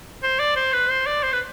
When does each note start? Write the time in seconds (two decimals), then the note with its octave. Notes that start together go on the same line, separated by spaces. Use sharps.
0.23 C5
0.39 D5
0.56 C5
0.73 B4
0.89 C5
1.06 D5
1.23 C5
1.32 B4